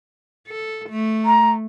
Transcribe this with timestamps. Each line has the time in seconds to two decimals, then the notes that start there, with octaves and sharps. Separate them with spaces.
0.47 A4
0.89 A3
1.25 A#5